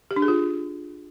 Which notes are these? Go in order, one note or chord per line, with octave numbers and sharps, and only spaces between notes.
G4
D4
G#4
F4